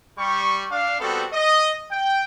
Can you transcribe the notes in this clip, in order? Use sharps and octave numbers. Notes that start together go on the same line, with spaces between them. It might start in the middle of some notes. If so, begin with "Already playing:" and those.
G3 C#6
D4 F5
G3 B3 C4 F#4 A4
D#5
G5